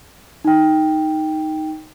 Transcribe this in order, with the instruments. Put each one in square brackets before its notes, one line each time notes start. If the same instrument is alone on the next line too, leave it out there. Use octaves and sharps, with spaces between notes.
[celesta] D#4 G5